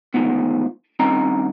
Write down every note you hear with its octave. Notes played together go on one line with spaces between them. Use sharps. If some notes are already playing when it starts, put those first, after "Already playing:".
D2 G#2 D#3 F3 B3
G2 D#3 C4 C#4 D#5 A#5